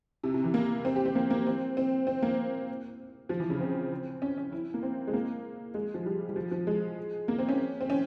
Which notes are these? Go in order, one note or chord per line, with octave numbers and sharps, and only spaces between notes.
C3
C3
E3
A#3
C4
G4
C4
A#3
A#3
C4
C4
C4
A#3
F3
E3
C#3
C4
C#4
C#4
E4
A#3
C4
G#3
A#3
G#3
F3
G3
G3
F3
F3
G#3
A#3
C4
C#4
C4
C#4